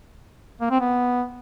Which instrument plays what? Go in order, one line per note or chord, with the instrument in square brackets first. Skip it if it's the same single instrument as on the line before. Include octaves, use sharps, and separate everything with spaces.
[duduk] A#3
C4
B3